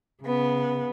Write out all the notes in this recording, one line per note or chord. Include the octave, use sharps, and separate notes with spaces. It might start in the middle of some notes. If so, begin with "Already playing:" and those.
C#3 B3